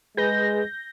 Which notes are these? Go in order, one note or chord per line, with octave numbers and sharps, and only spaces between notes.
G#3 G#4 B4 G6 A#6